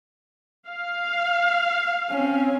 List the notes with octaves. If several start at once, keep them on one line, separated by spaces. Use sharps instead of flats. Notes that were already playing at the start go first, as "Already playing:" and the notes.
F5
C4 C#4